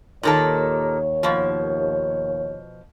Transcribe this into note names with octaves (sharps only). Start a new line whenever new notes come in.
D#2 A#2 D#3 A4 C#5
B2 F3